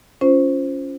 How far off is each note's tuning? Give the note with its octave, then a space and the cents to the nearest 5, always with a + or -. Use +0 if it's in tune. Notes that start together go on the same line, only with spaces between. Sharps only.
C#4 +0 F4 -15 C5 +0